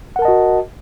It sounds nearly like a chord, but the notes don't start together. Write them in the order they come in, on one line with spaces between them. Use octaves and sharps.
F#5 A#4 A5 D#5 F#4